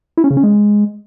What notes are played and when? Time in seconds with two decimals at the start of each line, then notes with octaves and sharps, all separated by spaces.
0.17 E4
0.24 C#4
0.30 C#3
0.37 C#4
0.43 G#3